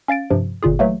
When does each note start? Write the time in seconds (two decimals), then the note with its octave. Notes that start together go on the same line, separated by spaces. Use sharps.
0.08 C#4 F5 A6 D7
0.30 G2 C3 F3
0.63 G1 A#2 F4 G#4
0.79 E3 F#3 A3 A#3